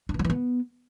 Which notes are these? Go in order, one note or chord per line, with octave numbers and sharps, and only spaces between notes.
D4
E3
F#3
E3
B3